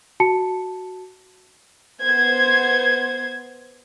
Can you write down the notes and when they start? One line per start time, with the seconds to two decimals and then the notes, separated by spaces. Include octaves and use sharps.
0.20 F#4 A5 C#7
2.02 B3 C5 G#6